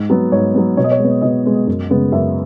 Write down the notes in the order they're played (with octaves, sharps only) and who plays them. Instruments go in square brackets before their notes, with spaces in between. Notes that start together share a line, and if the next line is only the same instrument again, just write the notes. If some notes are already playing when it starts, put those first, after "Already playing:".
Already playing: [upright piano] G#2
F#3 B3
G#2 C#5
F#3 B3
B2 C#5
D#5
C#5
G#3 B3
B2 D#5
G#3 B3
F#2
C#3 G#3 B3
F#2 E5